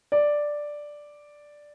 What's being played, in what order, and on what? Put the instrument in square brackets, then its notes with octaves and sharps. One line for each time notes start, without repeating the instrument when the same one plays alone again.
[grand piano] D5